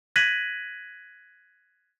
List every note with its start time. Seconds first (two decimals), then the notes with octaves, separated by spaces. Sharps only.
0.16 F#6 G#6 A#6 B6 D#7 F#7